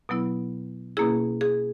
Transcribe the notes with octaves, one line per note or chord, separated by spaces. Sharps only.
B2 F#3 B3 E4
B2 A#3 C#4 E4 G#4
G#4